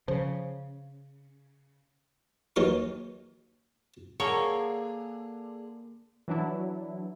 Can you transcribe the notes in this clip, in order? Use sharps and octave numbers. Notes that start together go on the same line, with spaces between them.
C#3 F3
D#2 E3 F#3 D#4 A#4 C#6
D3 A#3 G#4 A#4 C#5 F#5 A5
E3 F#3 D4 E4